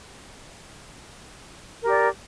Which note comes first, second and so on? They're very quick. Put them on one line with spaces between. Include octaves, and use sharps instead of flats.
A#4 G4 D5